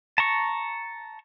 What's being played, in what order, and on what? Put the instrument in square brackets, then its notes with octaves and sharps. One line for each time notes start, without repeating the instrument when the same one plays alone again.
[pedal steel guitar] A5 A#5 C#6